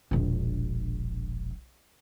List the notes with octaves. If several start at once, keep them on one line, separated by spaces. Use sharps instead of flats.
E1 A#1